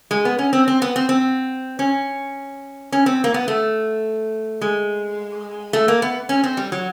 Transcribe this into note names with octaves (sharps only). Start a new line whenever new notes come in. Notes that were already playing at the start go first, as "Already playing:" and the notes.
G#3
B3
C#4
C4
C4
B3
C4
C4
C#4
C#4
C4
A#3
B3
A3
G#3
A3
A#3
B3
C#4
C4
G3
F#3